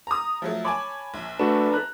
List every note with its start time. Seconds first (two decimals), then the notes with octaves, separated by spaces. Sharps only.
0.07 A#5 D#6
0.42 F3 F#3 A3
0.65 C#5 G#5 A5 B5 D6
1.14 A#1
1.39 A3 D4 F#4 A4 B4 E7
1.72 A#5 F#6